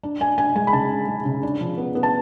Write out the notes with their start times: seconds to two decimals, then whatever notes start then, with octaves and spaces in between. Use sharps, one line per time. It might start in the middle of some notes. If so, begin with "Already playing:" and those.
0.03 D4
0.21 D4 G#5
0.38 D4 G#5
0.55 G#3 G#5
0.67 B5
0.73 C#3 A5
0.91 D4
1.08 G#3
1.25 C#3
1.43 D4
1.61 F3
1.77 B3
1.95 B3
2.03 A5